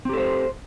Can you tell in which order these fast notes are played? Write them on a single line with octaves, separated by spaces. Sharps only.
C4 G4 A4 C5